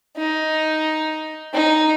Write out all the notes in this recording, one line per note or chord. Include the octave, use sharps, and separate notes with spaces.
D#4
D#4